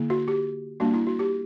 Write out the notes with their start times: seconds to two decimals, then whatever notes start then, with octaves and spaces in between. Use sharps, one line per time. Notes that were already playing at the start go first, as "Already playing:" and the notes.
Already playing: D3 A#3 E4
0.10 F#4
0.28 G4
0.80 G3 A#3 D4 F#4
0.94 E4
1.07 F#4
1.19 G4